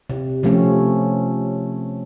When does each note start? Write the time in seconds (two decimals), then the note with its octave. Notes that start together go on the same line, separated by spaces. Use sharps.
0.09 C3
0.43 C3 F3 A3 C4 C#4